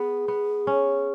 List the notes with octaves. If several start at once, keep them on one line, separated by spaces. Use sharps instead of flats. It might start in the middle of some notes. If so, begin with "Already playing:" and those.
Already playing: B3 G#4
B3
C#4